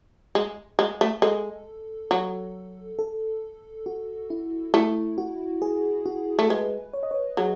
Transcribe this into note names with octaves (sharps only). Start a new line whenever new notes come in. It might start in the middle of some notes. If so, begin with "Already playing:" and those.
G#3
G#3
A3
G#3 A4
F#3
A4
F#4
E4
A3 E4
F#4
G#4
F#4
A3 A4
G#3 B4
C#5
D#5
C#5
F#3 G#4